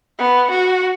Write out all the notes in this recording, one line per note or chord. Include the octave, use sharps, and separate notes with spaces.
B3
F#4